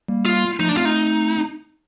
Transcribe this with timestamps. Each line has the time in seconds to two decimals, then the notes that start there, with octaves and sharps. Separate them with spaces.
0.09 G3 A#3
0.25 F4
0.59 F3 A3 D#4
0.69 D4
0.76 A3 C4 F4
0.85 D#4